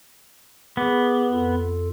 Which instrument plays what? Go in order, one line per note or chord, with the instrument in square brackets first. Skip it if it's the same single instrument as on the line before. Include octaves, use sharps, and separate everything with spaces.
[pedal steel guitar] B3 [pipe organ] G#4 D6
[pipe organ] F2 F4 A4